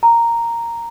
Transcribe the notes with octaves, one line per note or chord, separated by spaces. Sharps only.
A#5